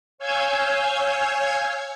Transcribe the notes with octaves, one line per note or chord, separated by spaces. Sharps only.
C#5 F5 G#5 E6 G6 G#6